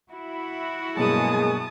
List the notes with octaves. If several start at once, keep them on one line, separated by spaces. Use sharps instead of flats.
E4 F#4
G2 B2 F#3 G#3 A#3 G#4 A5 D#6